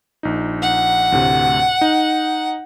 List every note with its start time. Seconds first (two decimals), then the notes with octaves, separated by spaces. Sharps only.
0.23 A#1 D#4
0.62 F#5
1.12 D2 A2 C3
1.81 D#4